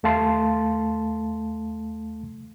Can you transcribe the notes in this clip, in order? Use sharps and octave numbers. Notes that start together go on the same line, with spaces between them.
D#2 A3 F5 A5 C6